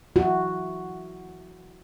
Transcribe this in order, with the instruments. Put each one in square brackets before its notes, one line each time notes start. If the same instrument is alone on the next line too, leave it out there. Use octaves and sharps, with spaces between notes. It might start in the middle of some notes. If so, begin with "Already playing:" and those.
[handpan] E4 F#4